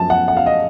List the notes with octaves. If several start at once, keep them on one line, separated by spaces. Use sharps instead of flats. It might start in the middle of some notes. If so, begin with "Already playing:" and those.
Already playing: F#2 F3 A5
F#5
F#5
F5
D#5